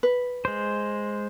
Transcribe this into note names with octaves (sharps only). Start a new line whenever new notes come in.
B4
G#3 C5